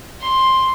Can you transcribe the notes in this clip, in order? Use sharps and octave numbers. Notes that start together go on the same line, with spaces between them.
C6